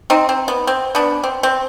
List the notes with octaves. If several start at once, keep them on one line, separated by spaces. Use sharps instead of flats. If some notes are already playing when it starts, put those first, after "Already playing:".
C4 D#4
C4
B3
C4
B3 D4
C4
C4